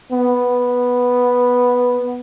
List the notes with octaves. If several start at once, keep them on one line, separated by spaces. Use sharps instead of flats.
B3